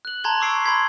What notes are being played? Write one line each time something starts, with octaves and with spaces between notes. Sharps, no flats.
F#6 F#7
A5 A#5 C6 G#6 F#7 G7
C#6 D6 E6 C7 D7
B5 C6 G#6 B6